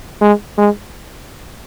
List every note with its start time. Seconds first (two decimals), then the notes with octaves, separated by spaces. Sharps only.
0.21 G#3
0.58 G#3